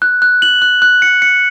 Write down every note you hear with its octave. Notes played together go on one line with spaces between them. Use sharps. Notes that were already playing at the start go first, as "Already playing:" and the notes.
F#6
F#6
F#7
F#6
F#6
C#7
C#7